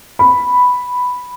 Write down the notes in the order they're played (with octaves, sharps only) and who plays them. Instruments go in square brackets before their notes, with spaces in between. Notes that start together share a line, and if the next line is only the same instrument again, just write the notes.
[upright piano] B5